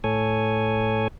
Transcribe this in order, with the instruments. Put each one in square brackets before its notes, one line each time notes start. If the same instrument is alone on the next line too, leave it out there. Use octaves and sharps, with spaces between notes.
[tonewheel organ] A2 A4 C#5 G#5